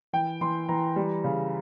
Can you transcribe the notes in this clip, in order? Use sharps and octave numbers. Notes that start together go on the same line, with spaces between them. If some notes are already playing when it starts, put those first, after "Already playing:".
E3 G5
E3 C6
E3 A#5
G3
C#3